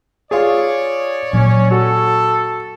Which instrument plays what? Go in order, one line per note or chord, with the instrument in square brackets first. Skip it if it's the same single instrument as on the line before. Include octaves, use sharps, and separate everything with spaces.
[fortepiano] F4 G#4 [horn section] C#5 D5
[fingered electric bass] A#2 F#3 [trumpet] C#4
[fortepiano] F#4 [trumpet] A4